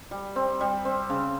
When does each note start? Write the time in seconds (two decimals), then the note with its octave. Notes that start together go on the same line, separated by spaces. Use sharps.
0.11 G3
0.36 C4
0.61 G3
0.85 C4
1.10 C#3